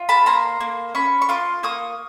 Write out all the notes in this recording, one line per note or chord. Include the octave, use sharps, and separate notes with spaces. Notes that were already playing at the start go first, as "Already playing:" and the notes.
Already playing: F4
A5 B5
A#3 A#5 C6
A#3
C#4 B5 C#6
C#6
F4 C6 D6
A#3 C#6 D#6